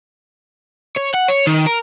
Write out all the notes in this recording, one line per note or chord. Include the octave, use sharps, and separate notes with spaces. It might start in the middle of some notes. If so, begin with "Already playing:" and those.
C#5
F#5
C#5
D#3
A#4